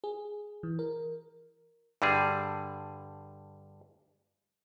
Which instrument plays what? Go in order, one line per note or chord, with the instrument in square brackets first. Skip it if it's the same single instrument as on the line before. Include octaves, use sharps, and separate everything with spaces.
[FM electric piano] G#4
E3
A#4
[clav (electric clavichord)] G2 D3 G3 G#4